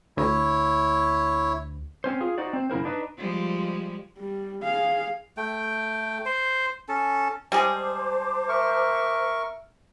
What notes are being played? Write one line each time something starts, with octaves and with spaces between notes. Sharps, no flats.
D2 E4 C#5
C4 C#4 C5
F4 G#4
D#4 F#4 C5 D5
C4 C5
F#2 C#3 E4 A#4 C5
D4 D#4 B4
F3 G3 G#3
G3
G#4 F5
A3 G5
C5
C#4 A4
G3 G#3 G#4 C5 A5 D6
A#4 E5 C#6